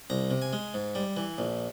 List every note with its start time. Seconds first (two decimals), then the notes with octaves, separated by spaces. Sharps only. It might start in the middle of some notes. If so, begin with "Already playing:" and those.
0.10 C2 A#5
0.31 C3
0.42 G#5
0.53 G#3
0.74 G#2
0.95 G3
1.17 E3
1.38 A#1